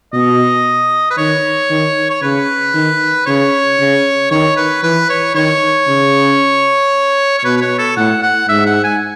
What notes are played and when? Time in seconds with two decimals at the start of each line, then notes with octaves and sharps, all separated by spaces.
0.13 B2 D#5
1.10 B4
1.18 D#3 C#5
1.70 D#3
2.10 C#5
2.22 C#3 B4
2.74 D#3
3.26 C#3 C#5
3.79 C#3
4.31 D#3 C#5
4.57 B4
4.83 E3 B4
5.10 C#5
5.35 D#3 C#5
5.88 C#3
7.38 C#5
7.44 B2 B4
7.57 B4
7.61 C#5
7.78 A4
7.97 A2 F#5
8.23 F#5
8.48 G#2 E5
8.66 F#5
8.84 G#5